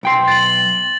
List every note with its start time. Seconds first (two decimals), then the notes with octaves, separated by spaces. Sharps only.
0.03 B1 G5 C6
0.28 A6 F#7